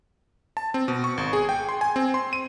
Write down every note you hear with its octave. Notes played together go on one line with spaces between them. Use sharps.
A5
C4
B2
C#6
G#1
G#4
G5
C6
G#5
C4
C6
D#7